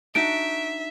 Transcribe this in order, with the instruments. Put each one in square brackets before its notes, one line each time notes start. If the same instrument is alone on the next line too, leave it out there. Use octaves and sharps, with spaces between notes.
[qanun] D4 D#4 F#4 [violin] E5 [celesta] D7